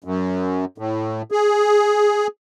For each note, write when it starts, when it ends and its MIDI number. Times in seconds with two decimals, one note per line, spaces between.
0.04 0.65 42
0.78 1.22 45
1.31 2.27 68